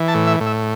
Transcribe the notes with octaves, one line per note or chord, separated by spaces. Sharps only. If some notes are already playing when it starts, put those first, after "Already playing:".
Already playing: E3
A5
A2
E5
A2
E5